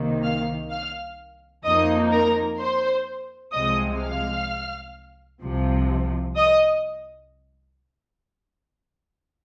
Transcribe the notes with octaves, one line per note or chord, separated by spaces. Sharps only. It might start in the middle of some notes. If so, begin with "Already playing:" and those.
Already playing: C2 C3 D#3 A#3
F5 F6
F5 F6
F2 F3 A#3 D#4 D#5 D#6
A#4 A#5
C5 C6
C2 C3 F3 G#3 D#5 D#6
F5 F6
C2 C3 F3
D#5 D#6